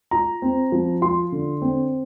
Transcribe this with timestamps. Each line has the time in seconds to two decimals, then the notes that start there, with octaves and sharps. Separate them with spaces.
0.11 F4 A#5
0.42 C4
0.72 F3
1.02 F4 C6
1.32 D3
1.62 C4